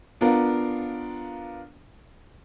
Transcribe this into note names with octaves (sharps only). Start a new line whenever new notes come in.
B3 D4 F4 A#4